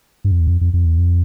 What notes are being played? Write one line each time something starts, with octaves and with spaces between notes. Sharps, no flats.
G2
F2
E2
F2
F2
F2
E2
F2